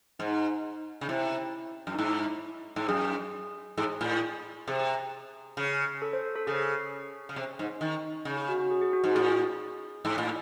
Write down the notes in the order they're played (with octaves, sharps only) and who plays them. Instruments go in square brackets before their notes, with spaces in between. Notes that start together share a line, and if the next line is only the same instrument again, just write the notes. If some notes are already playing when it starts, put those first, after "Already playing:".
[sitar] G#2 [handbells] D#4
[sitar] C#3
[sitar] C3 [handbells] E4
[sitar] F#2
[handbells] D#4
[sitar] G#2 [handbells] E4
[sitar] G#2
[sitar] F#2 [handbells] G#4
[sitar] G#2 [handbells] G#4
[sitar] A2
[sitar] C3 [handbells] G#4
[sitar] C#3
[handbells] A4
C5
A4
[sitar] C#3 [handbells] G#4
[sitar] C#3
C3
G#2
D#3
C#3
[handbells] G#4
F#4
F#4
G#4
G#4
F#4
[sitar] G#2 [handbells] F#4
[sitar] A2 [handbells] G#4
[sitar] G#2
A2